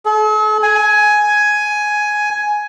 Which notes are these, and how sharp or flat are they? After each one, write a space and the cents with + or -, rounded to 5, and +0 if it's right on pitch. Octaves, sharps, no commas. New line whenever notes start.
A4 -45
G#5 +10